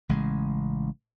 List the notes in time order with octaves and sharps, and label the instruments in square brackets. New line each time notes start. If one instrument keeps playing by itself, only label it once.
[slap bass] A1 C#3 G#3